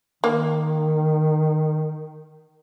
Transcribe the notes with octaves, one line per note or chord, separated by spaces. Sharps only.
D#3 A#3